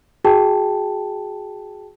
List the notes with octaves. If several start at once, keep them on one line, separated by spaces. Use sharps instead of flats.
F#4 G#4 G5 A5